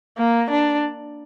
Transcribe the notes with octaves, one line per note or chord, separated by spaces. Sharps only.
A#3
D4